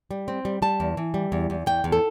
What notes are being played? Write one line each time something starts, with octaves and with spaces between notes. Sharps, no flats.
G3
C4
G3
G3 A5
E2
E3
G3
E2
E2
E2 G5
E2
A4